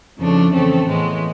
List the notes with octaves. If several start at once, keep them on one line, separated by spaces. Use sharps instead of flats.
F2 C#3 F3 A3 D4
C#3 E3 A3 C4
A2 E3 G#3 B3